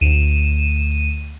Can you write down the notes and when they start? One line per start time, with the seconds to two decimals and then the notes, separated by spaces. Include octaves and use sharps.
0.01 D2 D#7 E7